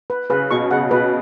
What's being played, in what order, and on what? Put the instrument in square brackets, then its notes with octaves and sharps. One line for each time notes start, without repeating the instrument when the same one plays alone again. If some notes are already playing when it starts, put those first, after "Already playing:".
[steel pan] B4
[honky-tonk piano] C#3 [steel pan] B4
[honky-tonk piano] B2 [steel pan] C#6
[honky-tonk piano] C#3 [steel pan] F#5
[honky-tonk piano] B2 [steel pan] B4